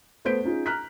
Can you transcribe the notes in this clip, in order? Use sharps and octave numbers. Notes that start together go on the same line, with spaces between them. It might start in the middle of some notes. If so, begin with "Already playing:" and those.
A3 B3 C5 G6 B6 D7
C#4 D#4 F4 G#4
A#5 F6 F#6 B6